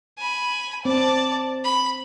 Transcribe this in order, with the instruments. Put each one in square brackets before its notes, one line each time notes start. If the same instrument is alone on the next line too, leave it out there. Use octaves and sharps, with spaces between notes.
[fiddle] G#5 B5
[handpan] C4 [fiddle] D5 A5
[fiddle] B5